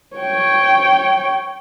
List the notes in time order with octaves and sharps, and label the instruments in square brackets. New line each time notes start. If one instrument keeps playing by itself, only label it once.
[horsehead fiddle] C#5 G5